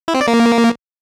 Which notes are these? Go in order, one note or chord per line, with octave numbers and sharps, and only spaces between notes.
E4
C4
D5
A#3